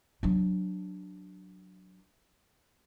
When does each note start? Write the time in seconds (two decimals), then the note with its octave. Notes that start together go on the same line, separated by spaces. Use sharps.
0.23 F#3 D4